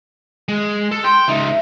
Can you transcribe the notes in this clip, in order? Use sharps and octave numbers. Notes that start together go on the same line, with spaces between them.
G#3
A4
G5 C6
C#2 D#4 E5